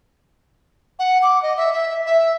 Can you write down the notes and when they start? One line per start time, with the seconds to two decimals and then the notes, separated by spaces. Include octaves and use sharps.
0.99 F#5
1.22 D6
1.42 D#5
1.57 E5
1.73 E5
2.07 E5